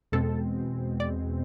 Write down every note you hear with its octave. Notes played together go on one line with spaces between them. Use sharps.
E2 B2 G#3 C4 A4
D5